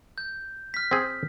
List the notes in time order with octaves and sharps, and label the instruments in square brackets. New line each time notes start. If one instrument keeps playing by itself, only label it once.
[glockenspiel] G6
F6 B6
[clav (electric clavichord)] C4 G#4